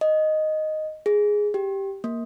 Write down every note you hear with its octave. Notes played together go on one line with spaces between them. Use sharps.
D#5
G#4
G4
A#3